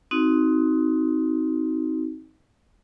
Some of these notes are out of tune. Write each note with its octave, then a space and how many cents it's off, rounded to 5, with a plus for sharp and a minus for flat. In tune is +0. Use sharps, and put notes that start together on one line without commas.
C4 +0 D#4 +20 F#4 +10